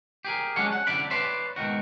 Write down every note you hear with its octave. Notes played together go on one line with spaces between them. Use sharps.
G4 G#4 A#4
F#3 G#3 C#4 D4 C#5 F#5
F#5
C2 F#2 D3 E4 D5 B5
B4 C#5 D5 E5 B5 C6
G#2 B2 D#3 F#4